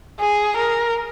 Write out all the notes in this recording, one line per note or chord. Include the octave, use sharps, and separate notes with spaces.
G#4
A#4